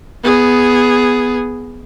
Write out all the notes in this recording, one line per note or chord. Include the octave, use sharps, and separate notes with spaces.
B3 G#4